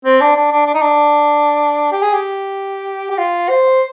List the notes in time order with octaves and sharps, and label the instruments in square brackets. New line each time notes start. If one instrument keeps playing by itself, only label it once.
[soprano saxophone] C4
D4
D4
D4
D4
D#4
D4
G4
G#4
G4
G4
F4
C5